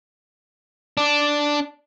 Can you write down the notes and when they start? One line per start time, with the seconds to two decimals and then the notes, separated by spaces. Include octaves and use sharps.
0.97 D4